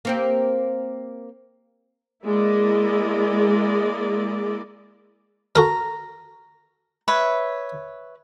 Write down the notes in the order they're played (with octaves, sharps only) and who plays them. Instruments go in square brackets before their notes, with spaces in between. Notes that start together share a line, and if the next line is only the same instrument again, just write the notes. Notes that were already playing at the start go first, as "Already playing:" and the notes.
[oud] A#3 C4 G4
[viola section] G#3 A#3 E4 D5 D#5
[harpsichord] F#4 A4 A#4 [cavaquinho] A#5
[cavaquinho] B4 C#5 E5